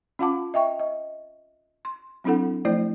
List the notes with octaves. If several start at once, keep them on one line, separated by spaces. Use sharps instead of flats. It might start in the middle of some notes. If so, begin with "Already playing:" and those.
C#4 F4 F5 F#5 A5 D6
D#5 E5 G5 C#6
D#5
C6
F#3 C4 D4 E4 A4 F#5
F3 A3 E4 C5 D5